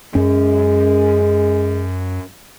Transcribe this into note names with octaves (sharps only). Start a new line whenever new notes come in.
F#2 G#3 C#4